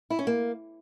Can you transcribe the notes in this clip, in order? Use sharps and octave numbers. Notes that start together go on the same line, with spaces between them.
E4
C#4
A#3